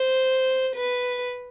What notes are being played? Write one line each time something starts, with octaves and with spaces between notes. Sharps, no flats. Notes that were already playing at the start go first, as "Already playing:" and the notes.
Already playing: C5
B4